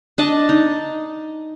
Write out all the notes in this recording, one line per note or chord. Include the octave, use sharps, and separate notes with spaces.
D4 D#5 A5
D#4